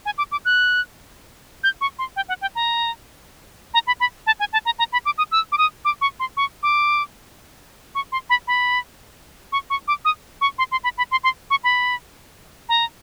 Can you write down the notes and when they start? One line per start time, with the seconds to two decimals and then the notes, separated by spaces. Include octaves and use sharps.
0.06 G#5
0.18 D6
0.32 D6
0.45 F#6
1.64 G6
1.81 C#6
1.99 C6
2.16 G5
2.29 F#5
2.41 G5
2.55 A#5
3.74 A#5
3.87 B5
4.00 B5
4.27 A5
4.40 G#5
4.53 A5
4.65 A#5
4.79 A#5
4.93 B5
5.06 D6
5.18 D#6
5.32 E6
5.52 D6
5.58 D#6
5.85 D6
6.01 C#6
6.20 C6
6.37 C#6
6.63 D6
7.95 C#6
8.12 C6
8.30 B5
8.48 B5
9.52 C#6
9.70 C#6
9.88 D6
10.05 D#6
10.41 C#6
10.58 C6
10.72 C6
10.84 B5
10.98 B5
11.11 C6
11.24 C6
11.50 C#6
11.64 B5
12.69 A#5